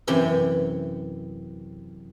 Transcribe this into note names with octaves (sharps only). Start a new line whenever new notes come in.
F#2 C3 E3 G5